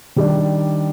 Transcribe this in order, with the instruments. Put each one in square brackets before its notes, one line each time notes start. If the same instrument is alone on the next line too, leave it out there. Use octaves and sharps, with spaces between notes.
[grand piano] D#3 G3 D4